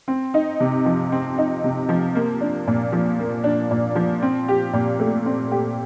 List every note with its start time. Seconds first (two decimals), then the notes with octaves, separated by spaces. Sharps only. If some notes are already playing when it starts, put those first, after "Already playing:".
0.08 C4
0.34 D#4
0.60 C3
0.86 F3
1.12 C4
1.38 D#4
1.64 C3
1.89 F3
2.15 A#3
2.41 D4
2.67 A#2
2.92 F3
3.19 A#3
3.44 D4
3.71 A#2
3.95 F3
4.22 C4
4.48 G4
4.73 A#2
5.00 A3
5.26 C4
5.51 G4